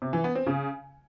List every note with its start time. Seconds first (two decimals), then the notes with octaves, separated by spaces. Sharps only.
0.02 C3
0.13 E3
0.24 B3
0.35 C4
0.47 C#3